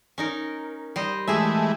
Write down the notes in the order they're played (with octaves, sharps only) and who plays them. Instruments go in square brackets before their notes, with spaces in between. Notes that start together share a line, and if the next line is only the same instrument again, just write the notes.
[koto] C#4 D#4 A#4
G3 C5 D#5
[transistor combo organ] E3 G#3 A3 [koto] G4 G#4 E5